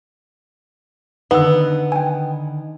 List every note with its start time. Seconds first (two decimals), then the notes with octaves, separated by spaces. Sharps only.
1.31 D3 D#3 B3 D#4 B4 E6
1.92 G5 G#5